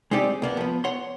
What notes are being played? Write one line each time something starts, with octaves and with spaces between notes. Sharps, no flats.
G#3 C4 D#4 G4 D5
C2 A#3 B3
F3 B3
C#5 F#5 C6